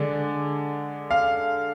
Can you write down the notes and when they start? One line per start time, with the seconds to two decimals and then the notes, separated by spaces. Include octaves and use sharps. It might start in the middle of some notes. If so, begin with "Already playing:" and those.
Already playing: D3 G#3 D4
1.11 F5